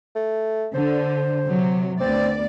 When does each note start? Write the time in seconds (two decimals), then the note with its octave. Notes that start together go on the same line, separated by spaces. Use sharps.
0.15 A3
0.74 D3 C5
1.47 C3 F#3
2.00 D2 B3 C4 D5